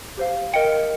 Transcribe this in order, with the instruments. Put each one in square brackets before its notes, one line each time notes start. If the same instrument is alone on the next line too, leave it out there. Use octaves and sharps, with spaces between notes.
[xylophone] G4 C5 F5
A#4 D#5 G5 C#7